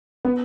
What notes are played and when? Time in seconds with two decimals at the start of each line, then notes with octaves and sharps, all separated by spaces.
0.25 B3